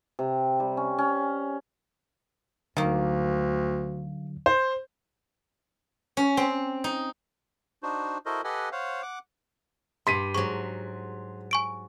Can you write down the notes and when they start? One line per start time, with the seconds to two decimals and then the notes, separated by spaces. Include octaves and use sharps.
0.19 C3
0.60 G3
0.77 C#4
0.98 C#4
2.77 D2 D3 D#3 F#3 A#3
4.46 C5
6.17 C#4
6.37 C4
6.84 D#4
7.83 D4 D#4 F#4 C5
8.26 E4 F#4 A4 A#4 C5 D#5
8.44 G4 A4 B4 D#5 F#5 G#5
8.72 C5 C#5 F5 F#5
9.02 F#5 D6
10.07 G2 C6 B6 D#7
10.34 G#2 F#3 C#6
11.51 G#5 C#6 D7